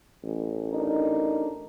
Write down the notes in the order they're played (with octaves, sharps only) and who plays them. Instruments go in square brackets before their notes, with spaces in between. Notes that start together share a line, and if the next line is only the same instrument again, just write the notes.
[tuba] A1
[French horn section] D4 D#4 A#4